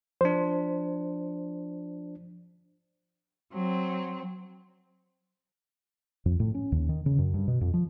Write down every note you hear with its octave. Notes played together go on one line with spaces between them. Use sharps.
F3 D4 C5
F#3 C4
F2
A2
C#4
D#2
D#3
C#3
F#2
G2
B2
F2
F3